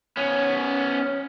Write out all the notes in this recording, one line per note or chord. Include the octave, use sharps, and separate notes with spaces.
B3 C#4